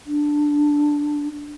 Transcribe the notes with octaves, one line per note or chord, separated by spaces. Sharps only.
D4